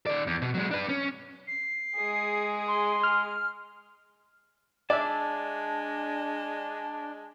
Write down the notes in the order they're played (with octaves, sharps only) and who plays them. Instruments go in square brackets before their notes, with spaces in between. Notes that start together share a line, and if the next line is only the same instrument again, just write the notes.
[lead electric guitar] D#3 D5
E2
B2
F#3 G#3
D4 B4
C#4
[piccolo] C7
[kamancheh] G#3 G#4
[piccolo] C6
[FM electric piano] F6
[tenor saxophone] G#3 [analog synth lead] D4 [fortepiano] D5 E5 [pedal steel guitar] A5